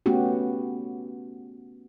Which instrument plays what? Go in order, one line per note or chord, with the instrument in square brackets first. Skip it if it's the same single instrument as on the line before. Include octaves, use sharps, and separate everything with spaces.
[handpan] A3 B3 C#4 F#4 G4